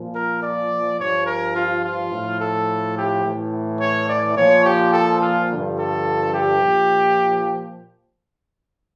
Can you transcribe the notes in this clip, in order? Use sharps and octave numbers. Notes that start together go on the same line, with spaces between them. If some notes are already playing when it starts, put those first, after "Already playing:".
Already playing: A#2 F3
A#4
D5
G2 F3 C#5
A#4
F4
F4
A2 F3
A4
G4
A2 E3
C#5
D5
A#2 F3 C#5
G4
A4
F4
G2 D3 F3
A4
G4
A#2 F3